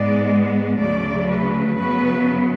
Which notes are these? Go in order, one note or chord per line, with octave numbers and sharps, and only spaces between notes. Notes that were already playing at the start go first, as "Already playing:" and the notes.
Already playing: G#2 G#3 B3 D5
D2 C#3 F#3 A3 D5
B4
F#2 C#3 F#3 B3 B4